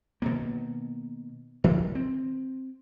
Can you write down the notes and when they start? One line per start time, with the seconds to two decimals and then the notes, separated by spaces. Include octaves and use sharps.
0.22 B2 D#3 A#3
1.64 D#3 F3 G3
1.95 C4